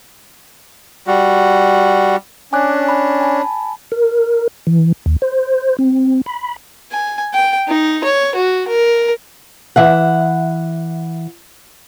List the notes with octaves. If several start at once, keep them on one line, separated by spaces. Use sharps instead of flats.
G3 F#4
C#4 D4 G#5 D6 F#6
B5
G#5 A5 B5
A#4
E3
D#2
C5
C4
B5
G#5
G5
D#4
C#5
F#4
A#4
E3 E5 F#5